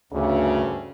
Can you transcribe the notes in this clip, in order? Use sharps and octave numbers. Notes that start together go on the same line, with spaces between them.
D2 G2 C#3